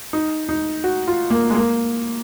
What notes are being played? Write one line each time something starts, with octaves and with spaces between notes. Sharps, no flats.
D#4
D#4
F#4
F4
A#3
G#3
A#3